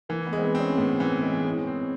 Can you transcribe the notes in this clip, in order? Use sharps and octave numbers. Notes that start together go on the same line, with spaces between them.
E3 A#3
B3
G#3
C4
B3
C4
C#4
A2 B3
E3
G#3
G#3
C4